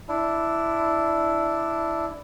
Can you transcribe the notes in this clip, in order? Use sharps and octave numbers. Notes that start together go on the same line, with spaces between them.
D4 E4